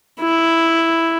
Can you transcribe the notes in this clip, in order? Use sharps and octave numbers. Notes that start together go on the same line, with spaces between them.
E4